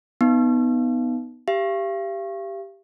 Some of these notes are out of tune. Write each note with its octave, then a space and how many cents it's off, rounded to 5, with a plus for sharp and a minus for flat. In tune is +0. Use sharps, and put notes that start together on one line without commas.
B3 +10 D#4 +0
G4 +0 F5 -40